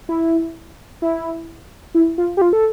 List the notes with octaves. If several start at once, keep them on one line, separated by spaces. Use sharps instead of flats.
E4
E4
E4
F4
G4
F4
A4